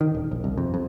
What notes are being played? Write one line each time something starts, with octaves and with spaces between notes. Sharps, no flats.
D#3
D#1
A#1
C2
F2
F2